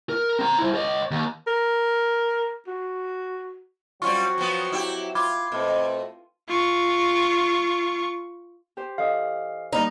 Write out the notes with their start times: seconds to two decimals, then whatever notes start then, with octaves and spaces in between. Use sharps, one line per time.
0.09 A#4
0.39 C4 A#5
0.58 E4 C5
0.75 C#5 D#5
1.11 D#2
1.47 A#4
2.67 F#4
4.02 F#3 G3 C4 C#4 F4 F#4 C#6
4.38 F3 B3
4.72 E4 G4
5.15 F4 B5 D6 G#6
5.52 B2 A3 C4
6.49 F4 C#6
8.77 G4 C5
8.98 E3 A4 D#5 F5 D#6
9.73 G3 A#3 D#4 B5 F6 A#6